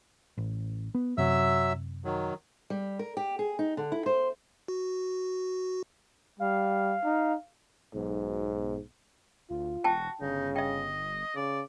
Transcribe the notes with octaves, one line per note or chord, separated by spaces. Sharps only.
A1
B3
F#2 C3 F#3 E5 E6
D#3 F#3
G3
A#4
G4
G#4
D#4
D3
E4
C5
F#4
G3 F5
D#4
B1 G#2
D2 F4
E1 F#4 G5 A5
G1 C#3 D#4
D#5 E5 G5
C#3 D5